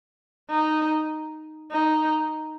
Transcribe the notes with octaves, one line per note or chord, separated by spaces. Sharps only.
D#4
D#4